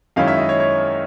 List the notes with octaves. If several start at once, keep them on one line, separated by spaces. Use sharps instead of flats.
F#2 D#3 G#3 C#4 E4 F5
E5
D#5
C#5
C#5